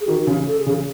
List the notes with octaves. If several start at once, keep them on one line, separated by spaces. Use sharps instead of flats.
G#4
D#3 F#4
C#3
A4
G#4
C#3